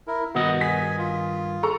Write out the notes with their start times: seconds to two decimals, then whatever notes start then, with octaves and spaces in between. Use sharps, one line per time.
0.07 E4 A#4
0.35 G2 B2 D#3 D#5 F#5
0.61 G#5 B6
0.99 F4
1.63 A4 A#5 C#6